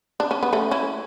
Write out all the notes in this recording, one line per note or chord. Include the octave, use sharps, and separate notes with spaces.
D4
C#4
B3
A3 C#4
C#4 E4